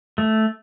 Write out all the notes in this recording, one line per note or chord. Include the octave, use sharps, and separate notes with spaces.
A3